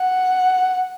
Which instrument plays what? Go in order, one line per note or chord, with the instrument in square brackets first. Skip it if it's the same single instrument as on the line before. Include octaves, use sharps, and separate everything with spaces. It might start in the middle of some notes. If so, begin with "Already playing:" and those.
Already playing: [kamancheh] F#5